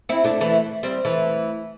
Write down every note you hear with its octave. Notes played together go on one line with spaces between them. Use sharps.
C4 E4
A3 D4
E3 A3
G3 C4
E3 A3